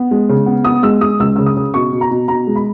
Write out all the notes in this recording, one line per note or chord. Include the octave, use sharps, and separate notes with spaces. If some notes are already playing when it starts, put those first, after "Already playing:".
Already playing: B3
G#3
C#3
B3
B3 D#6
G#3 E6
G#3 D#6
C#2 E6
C#3 E6
D#6
C#3
B2 C#6
B2
A#5
B2
B2 A#5
G#3
B5